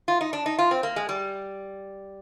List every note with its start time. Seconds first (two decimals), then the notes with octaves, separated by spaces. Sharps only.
0.08 F4
0.21 D#4
0.33 D4
0.46 D#4
0.59 F4
0.71 C4
0.83 A#3
0.96 G#3
1.09 G3